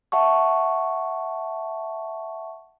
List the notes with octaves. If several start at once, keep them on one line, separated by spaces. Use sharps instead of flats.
E5 F#5 A5 C#6